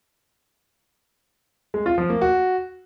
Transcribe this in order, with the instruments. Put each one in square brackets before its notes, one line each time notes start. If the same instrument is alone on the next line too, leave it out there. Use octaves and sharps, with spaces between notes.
[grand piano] G#3
F4
F3
A#3
F#4